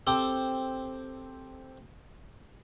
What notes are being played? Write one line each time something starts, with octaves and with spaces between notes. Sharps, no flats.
C4 G4 A4